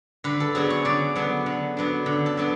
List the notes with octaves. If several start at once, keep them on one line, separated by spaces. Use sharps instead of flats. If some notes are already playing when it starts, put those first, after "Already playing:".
D3 B4
A4
F#3 B3 D4 G#4
C#5
D3 D5
F#3 B3 D4
D3
F#3 B3 D4
D3
A4
F#3 B3 D4